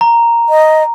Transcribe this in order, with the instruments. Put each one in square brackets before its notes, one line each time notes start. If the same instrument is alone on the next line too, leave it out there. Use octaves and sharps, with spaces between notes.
[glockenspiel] A#5
[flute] D#5